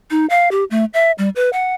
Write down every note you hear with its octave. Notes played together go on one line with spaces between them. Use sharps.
D#4
F5
G4
A3
E5
G3
B4
F#5